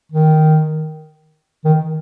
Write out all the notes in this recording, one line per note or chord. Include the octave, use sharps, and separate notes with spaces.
D#3
D#3